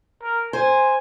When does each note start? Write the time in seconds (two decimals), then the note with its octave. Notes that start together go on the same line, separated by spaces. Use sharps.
0.22 A#4
0.53 C5 G#5